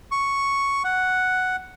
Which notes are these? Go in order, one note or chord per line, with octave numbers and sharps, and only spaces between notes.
C#6
F#5